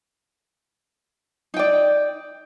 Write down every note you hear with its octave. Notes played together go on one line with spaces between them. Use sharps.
D#4 D5 G5